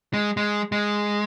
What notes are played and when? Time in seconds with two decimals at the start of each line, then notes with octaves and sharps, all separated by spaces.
0.14 G#3
0.37 G#3
0.72 G#3